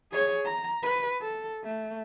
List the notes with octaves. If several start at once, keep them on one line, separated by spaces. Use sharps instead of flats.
G#4 C#5
A#5
B4
A4
A3